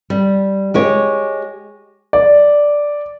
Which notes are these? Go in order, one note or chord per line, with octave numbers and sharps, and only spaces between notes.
G3
G#3 G4 C#5
D5